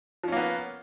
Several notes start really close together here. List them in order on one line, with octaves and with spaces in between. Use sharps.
F3 C#4 A#3 B3